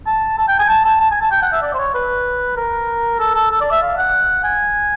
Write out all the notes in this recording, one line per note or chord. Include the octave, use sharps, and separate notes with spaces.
A5
A5
G5
G#5
A5
A5
A5
G#5
A5
G5
F#5
E5
D5
C5
C#5
B4
A#4
A4
A4
A4
D5
E5
F5
F#5
G#5